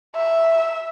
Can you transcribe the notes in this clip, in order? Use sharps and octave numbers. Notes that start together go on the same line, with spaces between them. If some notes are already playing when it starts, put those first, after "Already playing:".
E5